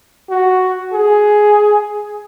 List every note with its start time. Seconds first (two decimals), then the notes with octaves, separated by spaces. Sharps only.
0.30 F#4
0.93 G#4